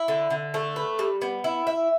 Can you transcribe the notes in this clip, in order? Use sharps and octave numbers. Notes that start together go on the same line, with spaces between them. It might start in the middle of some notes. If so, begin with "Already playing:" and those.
Already playing: E4
D3
D3
A3
B4
G3
B3
E4
E5